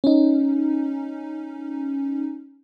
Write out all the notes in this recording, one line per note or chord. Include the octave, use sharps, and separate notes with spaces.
C#4 D#4